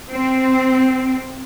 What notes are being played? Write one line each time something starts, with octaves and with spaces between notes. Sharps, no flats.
C4